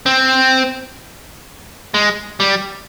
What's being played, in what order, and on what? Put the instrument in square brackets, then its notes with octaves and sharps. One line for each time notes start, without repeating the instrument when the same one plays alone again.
[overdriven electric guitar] C4
G#3
G3